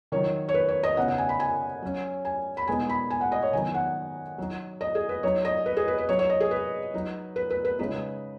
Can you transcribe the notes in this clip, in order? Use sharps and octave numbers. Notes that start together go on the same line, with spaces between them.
D#3 F#3 D#4 C#5
C#5
B4
C#5
D#5
C#3 B3 D#4 F#5
F#5
G#5
B5
G#5
F#3 C#4
G#5
B5
B2 G#3 B3 D#4 G#5
B5
G#5
F#5
D#5
C#5
D#3 F#3 B3 D#4 G#5
F#5
F#3 D#4
D#5
G#4
B4
F#3 D#4 C#5
D#5
B4
G#4
B4
B4
F#3 D#4 C#5
C#5
D#5
G#4
B4
F#3 D#4
B4
B4
B4
C#3 G#3 D#4 B4